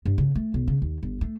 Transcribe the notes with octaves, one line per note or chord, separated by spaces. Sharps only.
G2
C#3
A3
B1
C#3
D#2
G1
A3